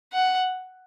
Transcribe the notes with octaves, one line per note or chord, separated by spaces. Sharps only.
F#5